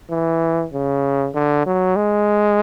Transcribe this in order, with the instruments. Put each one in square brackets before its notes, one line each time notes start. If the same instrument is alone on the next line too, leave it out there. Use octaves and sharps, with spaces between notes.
[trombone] E3
C#3
D3
F#3
G#3